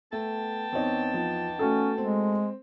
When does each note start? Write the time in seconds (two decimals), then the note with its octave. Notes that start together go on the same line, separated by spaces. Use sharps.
0.13 A3 B3 G5 A5
0.72 E2 C4 D#4 C#5
1.14 F3
1.59 A3 C#4 F#4 A4
1.98 G#3 C4